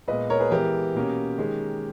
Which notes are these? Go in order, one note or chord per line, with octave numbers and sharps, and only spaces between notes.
A#2 G#3 B3 B4 D#5
A#4 C#5
G#4 B4
E3 G#3 B3 G4 A#4
B2 A#3 C#4
D#3 G#3 C#4